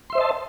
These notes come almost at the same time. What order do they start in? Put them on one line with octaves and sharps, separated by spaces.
C6 E5 C5 D#5 A5